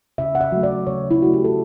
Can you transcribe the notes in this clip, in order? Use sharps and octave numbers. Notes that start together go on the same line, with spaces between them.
C#3 E5
F#5
E5
F#3 A3
D5
C#3 C#5
E4
F#3 A3 F#4
G4
A4